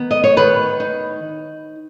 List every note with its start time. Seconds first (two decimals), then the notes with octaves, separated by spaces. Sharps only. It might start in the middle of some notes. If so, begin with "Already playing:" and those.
Already playing: D#3 B3
0.11 D#5
0.24 C#5
0.36 D#3 B4
0.80 D#4